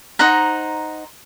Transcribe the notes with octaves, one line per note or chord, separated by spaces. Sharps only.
D#4 C5 F#5 A#5